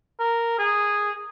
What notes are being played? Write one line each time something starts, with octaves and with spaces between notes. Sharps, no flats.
A#4
G#4